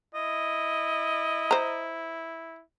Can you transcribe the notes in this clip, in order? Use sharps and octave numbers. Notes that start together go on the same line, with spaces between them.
E4 D#5
C5 A#5